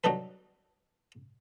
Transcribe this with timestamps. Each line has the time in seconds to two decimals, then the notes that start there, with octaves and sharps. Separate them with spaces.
0.04 F#3 G3 D4 D#4 A4 B4